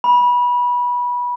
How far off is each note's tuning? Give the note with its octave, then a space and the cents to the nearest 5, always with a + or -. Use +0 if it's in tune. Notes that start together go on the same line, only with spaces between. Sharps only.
B5 -20